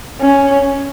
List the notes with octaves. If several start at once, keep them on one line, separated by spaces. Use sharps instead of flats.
C#4